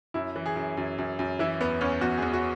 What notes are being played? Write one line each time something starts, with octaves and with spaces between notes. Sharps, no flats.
F#2 E4
E3
G#4
F#2
F#2
F#2
F#2
E3 E4
E2 B3
E2 C#4
E2 F#4
G#4
E2
F#4